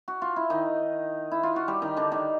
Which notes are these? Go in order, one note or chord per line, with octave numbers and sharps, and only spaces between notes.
F#4
F4
E4
D#3 D#4
E4
F4
F#4
G3 G4
D#3 D#4
D3 D4
D#3 D#4